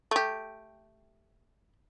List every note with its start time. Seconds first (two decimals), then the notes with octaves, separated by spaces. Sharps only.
0.11 A3 G4